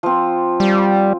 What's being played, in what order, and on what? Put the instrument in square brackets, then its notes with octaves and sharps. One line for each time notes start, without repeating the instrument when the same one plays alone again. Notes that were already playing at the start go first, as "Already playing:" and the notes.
[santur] F3 C4
[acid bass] G3